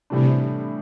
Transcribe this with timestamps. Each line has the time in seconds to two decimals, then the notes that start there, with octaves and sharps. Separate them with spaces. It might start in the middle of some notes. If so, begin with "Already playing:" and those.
0.10 A2 C3 E3 G3 D4